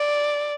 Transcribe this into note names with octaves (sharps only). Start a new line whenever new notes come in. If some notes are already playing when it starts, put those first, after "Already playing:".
Already playing: D5